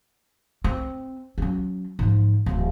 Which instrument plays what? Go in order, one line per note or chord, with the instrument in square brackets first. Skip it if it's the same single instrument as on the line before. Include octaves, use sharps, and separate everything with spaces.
[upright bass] C4
F#3 C#4
G#2 F3
D1 E3